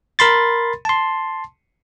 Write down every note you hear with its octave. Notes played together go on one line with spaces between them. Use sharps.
A#4 B5 C6 A6
A5 C6